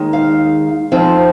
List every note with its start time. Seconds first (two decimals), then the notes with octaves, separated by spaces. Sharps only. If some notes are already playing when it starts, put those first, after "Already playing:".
Already playing: D#2 D#3 G#3 D#4
0.13 F5
0.92 F2 F3 C4 D#4